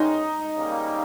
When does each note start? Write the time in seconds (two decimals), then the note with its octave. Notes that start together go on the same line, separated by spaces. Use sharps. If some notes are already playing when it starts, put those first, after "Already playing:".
Already playing: E2 D#3 G#3 C#4 D#4
0.56 C#3 G3 A#3